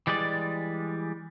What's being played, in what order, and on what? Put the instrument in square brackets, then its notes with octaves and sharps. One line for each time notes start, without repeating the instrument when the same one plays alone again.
[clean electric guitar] E3 G3 G#3 D5